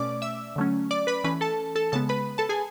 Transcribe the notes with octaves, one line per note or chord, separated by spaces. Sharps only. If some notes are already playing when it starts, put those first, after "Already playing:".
Already playing: B2 A3 C#4 D5 D6
E5 E6
D3 F#3 A3 C#4
D5 D6
B4 B5
E3 A3 C#4 B4 B5
A4 A5
A4 A5
C#3 G#3 B3 A4 A5
B4 B5
A4 A5
G#4 G#5